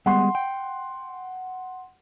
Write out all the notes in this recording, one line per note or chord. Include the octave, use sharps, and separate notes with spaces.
G3 G#3 B3 F#5 C6
G5